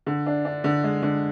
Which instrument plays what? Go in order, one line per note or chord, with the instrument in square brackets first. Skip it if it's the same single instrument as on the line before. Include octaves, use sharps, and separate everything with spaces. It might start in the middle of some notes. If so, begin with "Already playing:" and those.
[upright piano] D3
D4
D4
D3
G#3
D3